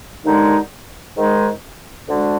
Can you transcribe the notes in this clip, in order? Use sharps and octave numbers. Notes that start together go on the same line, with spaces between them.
D#2 D3 G#3 D#4
G#2 D#3 G#3 D#4
D2 D3 G#3 D4 F#4